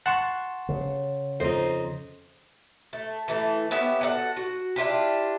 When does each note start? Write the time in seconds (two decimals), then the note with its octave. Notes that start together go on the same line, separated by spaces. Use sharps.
0.06 F#5 A5 C6 C#6
0.69 C#3
1.40 F2 D#4 C5
2.93 A3
3.28 E3 A3
3.71 B3 C#4 G4 E5
4.01 F#4 A4 D5 F#5
4.36 F#4
4.76 D4 E4 F4 G4